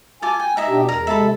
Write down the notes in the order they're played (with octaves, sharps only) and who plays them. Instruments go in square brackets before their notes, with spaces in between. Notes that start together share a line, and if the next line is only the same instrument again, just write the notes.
[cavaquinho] F4 A4 D6 [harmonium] G#5
[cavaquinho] G5
D#4 E5 D#6
[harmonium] B2 D4 G4
[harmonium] E2 [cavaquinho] A#4
[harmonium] C3 G#3 A4 [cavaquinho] E5 A5 B5